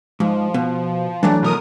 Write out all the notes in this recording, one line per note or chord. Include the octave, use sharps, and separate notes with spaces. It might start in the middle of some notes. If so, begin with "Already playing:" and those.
G#2 F3
B2
E3 F#3 A3 D4
B2 A#4 D#6